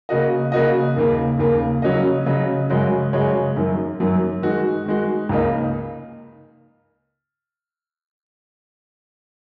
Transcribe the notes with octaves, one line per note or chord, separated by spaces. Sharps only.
C#3 A#3 F#4 D#5
C#3 A#3 F#4 D#5
D#2 C#3 A#3
D#2 C#3 A#3
C#3 F#3 C#4 F#4 D#5
C#3 F#3 C#4 F#4 D#5
F#2 C#3 G#3 F#4 C#5
F#2 C#3 G#3 F#4 C#5
F#2 D#3 F#3
F#2 D#3 F#3
D#3 G#3 F#4
D#3 G#3 F#4
C#2 C#3 A#3 D#4